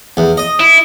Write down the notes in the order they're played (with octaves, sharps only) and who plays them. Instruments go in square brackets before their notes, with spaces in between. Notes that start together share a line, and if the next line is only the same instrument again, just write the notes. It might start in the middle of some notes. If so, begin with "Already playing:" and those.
[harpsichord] E2
D#5
[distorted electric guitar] E4